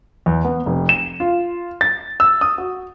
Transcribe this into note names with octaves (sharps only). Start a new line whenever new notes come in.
E2
B3
F1
E7
F4
A6
E6
D#6
F#4